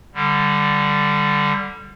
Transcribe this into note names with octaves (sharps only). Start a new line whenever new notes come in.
D3 G3